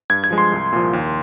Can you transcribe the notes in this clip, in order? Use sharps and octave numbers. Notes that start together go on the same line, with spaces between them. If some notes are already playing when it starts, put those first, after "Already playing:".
G2 G#6
G#6
F3 G#3
C6
C2
A#2 F3
D#2